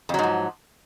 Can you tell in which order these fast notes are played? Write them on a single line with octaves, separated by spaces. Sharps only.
F2 F#3 G#2 F3